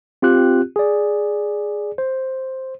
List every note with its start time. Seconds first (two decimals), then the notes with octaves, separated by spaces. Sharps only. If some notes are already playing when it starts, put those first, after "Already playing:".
0.22 C4 F4 G4 F#6
0.76 G#4 D5
1.98 C5